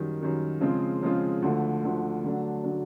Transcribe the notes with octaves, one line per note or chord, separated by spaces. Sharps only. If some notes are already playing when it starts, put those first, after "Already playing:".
Already playing: F#2 D#3 G3
F#2 D#3 G3
C#3 F3 G#3 C4 F4
C#3 F3 G#3 C4 F4
D2 D3 F3 A3
D2 D3 F3 A3
D3 F#3 A3 D4
D3 F#3 A3 D4